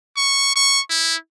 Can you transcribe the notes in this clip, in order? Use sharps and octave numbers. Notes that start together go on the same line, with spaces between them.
C#6
C#6
E4